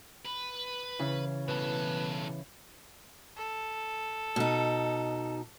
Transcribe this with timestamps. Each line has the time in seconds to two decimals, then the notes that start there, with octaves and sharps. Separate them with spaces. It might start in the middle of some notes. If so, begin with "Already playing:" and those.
0.26 B4
0.99 C#3 E3
1.48 B2 A4 B4
3.37 A4
4.36 B2 D#4